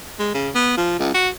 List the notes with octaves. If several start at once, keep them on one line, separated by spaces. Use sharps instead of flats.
G#3
C#3
B3
F3
C#2
F#4